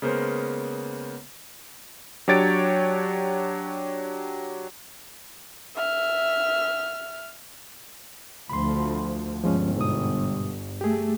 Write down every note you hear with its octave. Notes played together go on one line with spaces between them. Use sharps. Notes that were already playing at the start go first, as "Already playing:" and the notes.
C#3 G#3 A#3 B3 A#4 C5
F#3 D4 G4 C#5 A6 D7
E5 F6
D2 F3 B5 C6
G1 F3 G#3 C#4
G#2 B2 D#6
A3 G4 G#4